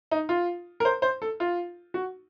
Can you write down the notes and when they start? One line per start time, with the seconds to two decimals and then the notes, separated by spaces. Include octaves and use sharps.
0.11 D#4
0.29 F4
0.80 A#4
0.85 C5
1.02 C5
1.22 A4
1.40 F4
1.94 F#4